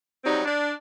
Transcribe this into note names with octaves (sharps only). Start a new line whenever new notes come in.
F#3 G3 C4 D#4
D4